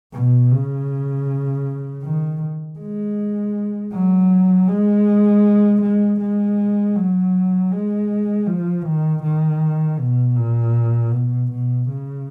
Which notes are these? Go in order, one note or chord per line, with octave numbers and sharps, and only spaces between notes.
B2
C#3
D#3
G#3
F#3
G#3
G#3
G#3
F#3
G#3
F3
D#3
D#3
B2
A#2
B2
B2
C#3